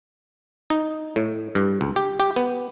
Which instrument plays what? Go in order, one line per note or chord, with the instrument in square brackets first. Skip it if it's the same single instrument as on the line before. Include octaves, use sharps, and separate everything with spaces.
[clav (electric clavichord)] D#4
A2
G2
C#2
G4
G4
B3